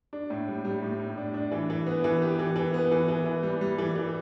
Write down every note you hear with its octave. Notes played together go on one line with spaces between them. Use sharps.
D4
A2
G3
G3
A2
A2
D4
D4
E3
E3
B3
E3
G4
E3
E3
B3
E3
E3
E3
G3
G3
E3
E3